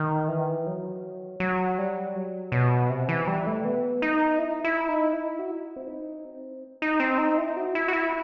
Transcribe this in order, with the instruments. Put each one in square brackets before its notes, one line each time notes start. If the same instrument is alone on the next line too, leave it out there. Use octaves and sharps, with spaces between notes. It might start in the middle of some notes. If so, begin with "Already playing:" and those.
Already playing: [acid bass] D#3
E3
F#3
F#3
G3
F#3
B2
C3
E3
G3
A3
B3
D#4
E4
E4
D#4
E4
F#4
E4
C4
D#4
C4
D#4
C4
D#4
E4
F#4
E4
F#4
E4